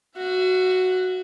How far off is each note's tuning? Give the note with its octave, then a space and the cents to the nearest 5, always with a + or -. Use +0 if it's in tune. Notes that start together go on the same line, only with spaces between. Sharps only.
F#4 +0 E5 +40